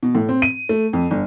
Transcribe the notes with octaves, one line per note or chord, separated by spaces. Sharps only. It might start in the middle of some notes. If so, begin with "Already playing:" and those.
B2
A2
C4
D#7
A3
F2
G1